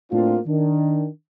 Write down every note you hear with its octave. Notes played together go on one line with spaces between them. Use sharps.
A2 A#3 C4 D4 F4
D#3 D4